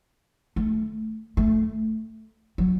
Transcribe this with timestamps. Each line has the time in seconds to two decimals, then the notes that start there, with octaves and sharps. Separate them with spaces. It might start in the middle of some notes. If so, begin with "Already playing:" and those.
0.56 A3
1.37 A3
2.58 F#3